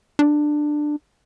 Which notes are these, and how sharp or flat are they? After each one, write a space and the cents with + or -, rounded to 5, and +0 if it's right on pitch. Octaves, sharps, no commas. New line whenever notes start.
D4 +15